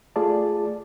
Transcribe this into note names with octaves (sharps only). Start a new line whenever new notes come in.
A3 F4 G#4 D5 A5